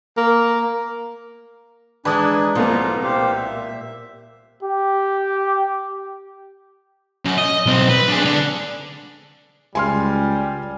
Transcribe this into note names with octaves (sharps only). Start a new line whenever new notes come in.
A#3
E3 G#3 D4 D#4 B4 D5 D#6
C2 A#2 F3 A#3 B3 F4
G4 C5 F5
E5
G4
F#2
D#5
B1 C4
B4
D4 G#4
D3 D4
C#2 G3 G#5 C6 F6